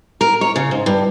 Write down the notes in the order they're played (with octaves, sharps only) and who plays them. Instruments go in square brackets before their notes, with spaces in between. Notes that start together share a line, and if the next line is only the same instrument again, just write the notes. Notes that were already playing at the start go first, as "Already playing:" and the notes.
[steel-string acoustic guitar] A#4
C#5
C#3
G#2
G2